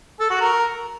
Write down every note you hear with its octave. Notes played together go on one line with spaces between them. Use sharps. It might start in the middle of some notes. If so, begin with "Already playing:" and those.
A4
F#4
A#4